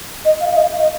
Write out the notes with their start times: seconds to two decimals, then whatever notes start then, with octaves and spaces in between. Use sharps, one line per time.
0.25 D#5
0.41 F5
0.52 F5
0.57 D#5
0.73 F5
0.79 D#5